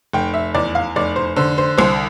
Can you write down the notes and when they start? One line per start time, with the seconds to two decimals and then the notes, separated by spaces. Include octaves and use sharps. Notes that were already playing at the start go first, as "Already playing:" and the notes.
0.13 F1 G5
0.34 E5
0.54 E2 D5
0.75 F5
0.96 F1 D5
1.16 C5
1.36 D3 C5
1.58 C5
1.78 C2 C5